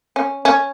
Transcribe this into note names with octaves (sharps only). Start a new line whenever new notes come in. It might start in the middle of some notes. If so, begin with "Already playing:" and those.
C#4
C#4